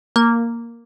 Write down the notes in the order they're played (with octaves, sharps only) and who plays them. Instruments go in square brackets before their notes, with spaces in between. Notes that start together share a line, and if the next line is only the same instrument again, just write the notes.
[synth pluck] A#3